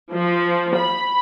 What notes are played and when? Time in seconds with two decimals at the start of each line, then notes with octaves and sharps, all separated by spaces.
0.12 F3
0.76 B5